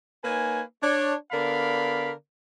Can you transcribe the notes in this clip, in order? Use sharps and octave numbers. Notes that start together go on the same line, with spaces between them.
A#3 D#4 B4 C#5 G#5
D4 C#5
D3 B3 A#4 D5 F5 B5